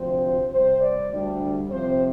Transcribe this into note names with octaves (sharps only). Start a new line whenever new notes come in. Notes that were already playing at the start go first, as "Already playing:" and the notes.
Already playing: D2 C3 F3 C4 C5
C3 G3 C4 C5
D5
D2 D3 G3 D4
C3 F3 C4 C5